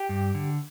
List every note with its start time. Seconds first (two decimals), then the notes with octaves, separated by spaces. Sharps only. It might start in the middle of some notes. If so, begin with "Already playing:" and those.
Already playing: G4
0.09 G2
0.35 D3